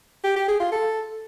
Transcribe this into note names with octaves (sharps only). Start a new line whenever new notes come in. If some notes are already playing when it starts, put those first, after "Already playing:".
G4
G4
G#4
F4
A4